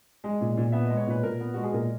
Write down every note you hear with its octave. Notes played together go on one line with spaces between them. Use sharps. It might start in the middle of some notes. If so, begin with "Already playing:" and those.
G#3 G#4
A#2
A#2
B3 E5
G#3 D#5
C#5
A#2 B4
A#2 A#4
B3
G#3 F#4
G#4
A#2 A#4